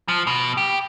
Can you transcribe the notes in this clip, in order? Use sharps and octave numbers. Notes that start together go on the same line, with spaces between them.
F3
B2
G4